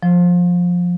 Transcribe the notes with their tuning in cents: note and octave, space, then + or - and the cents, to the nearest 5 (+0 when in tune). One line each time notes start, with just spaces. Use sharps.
F3 +15